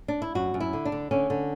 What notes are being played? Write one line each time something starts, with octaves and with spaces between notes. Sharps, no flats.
D4
E4
F#2 F#4
F#2
E4
D3
D4
D3
D3 C#4
D3